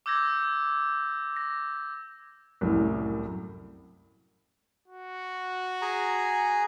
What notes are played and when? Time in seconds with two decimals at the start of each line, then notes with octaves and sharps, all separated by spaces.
0.06 D6 E6 G6 G#6 A#6
1.36 A#6
2.61 C2 F#2 A2
4.88 F#4
5.82 G#4 G#5 A#5